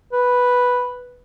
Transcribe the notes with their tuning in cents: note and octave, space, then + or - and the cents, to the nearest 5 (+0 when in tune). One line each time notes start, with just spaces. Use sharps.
B4 -5